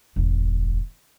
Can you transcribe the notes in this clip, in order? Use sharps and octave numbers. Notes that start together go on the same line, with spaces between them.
E1 A1